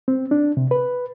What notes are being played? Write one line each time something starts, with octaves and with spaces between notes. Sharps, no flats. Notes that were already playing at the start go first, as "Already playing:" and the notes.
C4
D4
C3
B4